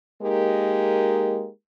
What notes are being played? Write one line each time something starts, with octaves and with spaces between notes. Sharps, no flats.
G#3 A#3 D#4 G4 A#4